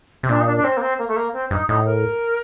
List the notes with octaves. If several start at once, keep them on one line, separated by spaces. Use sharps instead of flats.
C3
A#2 D4
D#4
D4
D4
C4
A#3
C4
A#3
A3
A#3
C4
G2 D#4
A2 D#4
A#4